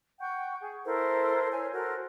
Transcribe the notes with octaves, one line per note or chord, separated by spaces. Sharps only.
F#5 G5 C#6 G6
G#4
E4 A4 A#4 C5
C#5 G#5
F#4 A4 A#4 C5